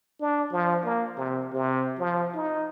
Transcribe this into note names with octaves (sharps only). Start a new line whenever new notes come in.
D4
F3
A#3
C3
C3
F3
D#4